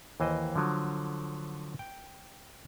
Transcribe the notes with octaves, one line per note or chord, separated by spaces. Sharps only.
D#2 E3 C5 D#5
D3 F3 F#3
G5